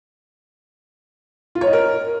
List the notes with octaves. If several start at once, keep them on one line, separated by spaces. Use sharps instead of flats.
F4
C#5
D#5
A#4